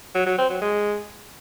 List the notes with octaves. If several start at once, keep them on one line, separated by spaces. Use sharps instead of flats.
F#3
F#3
C4
F#3
G#3